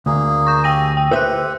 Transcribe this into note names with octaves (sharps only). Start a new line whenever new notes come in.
D2 A#3 G#4
C#6 G6
G4 G#4 G5 A#6 D#7
G5
G4 B4 C5 E5 E6 F#6